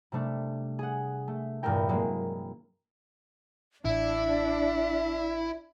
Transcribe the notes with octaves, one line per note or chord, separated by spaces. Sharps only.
C3 G3 A3 D4
G#4 F#5
A3
E2 G2 A#2 A3 A#4 G5
F#3 G#3 A#3 C4
A1 D4 E4 E5